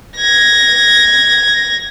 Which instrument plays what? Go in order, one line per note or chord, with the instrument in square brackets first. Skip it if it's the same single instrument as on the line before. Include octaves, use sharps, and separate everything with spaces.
[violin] G#6 A#6